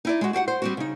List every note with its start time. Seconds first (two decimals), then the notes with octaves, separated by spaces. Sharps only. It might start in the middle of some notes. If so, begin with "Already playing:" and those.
0.05 D#4 E4 D5
0.21 G#3 F#4
0.33 F#4 G4 F5 F#5
0.48 C5
0.62 G3 C4 F#4
0.77 C#3 D#4